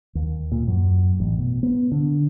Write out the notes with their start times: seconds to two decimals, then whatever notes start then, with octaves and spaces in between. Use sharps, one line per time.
0.15 D#2
0.52 A#2
0.67 F#2
1.20 A1
1.38 B2
1.63 B3
1.92 D3